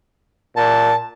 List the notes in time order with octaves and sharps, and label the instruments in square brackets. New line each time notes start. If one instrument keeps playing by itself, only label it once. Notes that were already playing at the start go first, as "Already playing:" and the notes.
[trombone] A#2 [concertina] A5